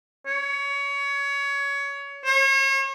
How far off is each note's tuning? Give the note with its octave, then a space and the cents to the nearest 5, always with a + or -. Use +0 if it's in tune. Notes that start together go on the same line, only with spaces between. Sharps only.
C#5 +20
C#5 -40